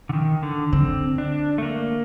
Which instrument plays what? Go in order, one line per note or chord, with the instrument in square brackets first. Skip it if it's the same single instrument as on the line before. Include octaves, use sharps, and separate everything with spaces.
[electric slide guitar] D3
D#3
D3
[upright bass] D3 [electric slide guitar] C4
[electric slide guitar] D4
A3
A#3